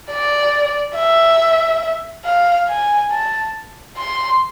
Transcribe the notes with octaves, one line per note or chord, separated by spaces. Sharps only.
D5
E5
F5
G#5
A5
C6